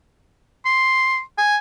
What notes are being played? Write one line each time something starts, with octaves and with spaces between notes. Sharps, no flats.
C6
G#5